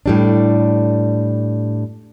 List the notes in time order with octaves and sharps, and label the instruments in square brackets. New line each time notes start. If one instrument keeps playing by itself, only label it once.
[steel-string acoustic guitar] A2 G3 D4